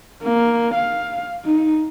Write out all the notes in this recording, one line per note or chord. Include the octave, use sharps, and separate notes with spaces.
A#3
F5
D#4